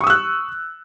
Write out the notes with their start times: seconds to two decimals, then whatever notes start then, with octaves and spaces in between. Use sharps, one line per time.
0.01 C#6
0.04 D#6
0.07 E6
0.10 F#6